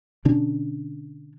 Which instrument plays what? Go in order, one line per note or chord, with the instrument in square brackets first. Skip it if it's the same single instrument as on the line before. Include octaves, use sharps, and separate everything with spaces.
[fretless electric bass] B2 D3 C#4 D4